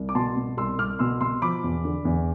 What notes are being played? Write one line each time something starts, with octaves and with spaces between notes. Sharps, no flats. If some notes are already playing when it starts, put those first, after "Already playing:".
Already playing: C2
D6
B2 A5 C6
B2
C2 C6 E6
C2 D6 F6
B2 C6 E6
B2 C6 E6
F3 B5 D6
E2
D3
E2